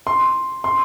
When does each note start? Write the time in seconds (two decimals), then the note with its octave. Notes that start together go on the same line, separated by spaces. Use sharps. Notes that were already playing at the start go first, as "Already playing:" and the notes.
0.07 C6
0.64 C6